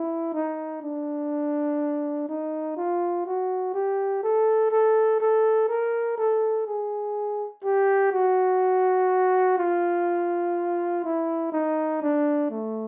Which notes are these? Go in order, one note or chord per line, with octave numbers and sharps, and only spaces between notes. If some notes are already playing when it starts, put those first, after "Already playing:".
Already playing: E4
D#4
D4
D#4
F4
F#4
G4
A4
A4
A4
A#4
A4
G#4
G4
F#4
F4
E4
D#4
D4
A3